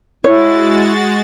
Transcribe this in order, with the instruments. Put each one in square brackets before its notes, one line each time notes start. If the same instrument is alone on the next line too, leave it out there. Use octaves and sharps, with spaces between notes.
[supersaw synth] G#3 F#4 A6 [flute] E4 [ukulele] C#5